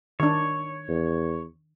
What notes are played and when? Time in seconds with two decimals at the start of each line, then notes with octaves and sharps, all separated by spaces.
0.20 D#3 D4 C#5
0.89 E2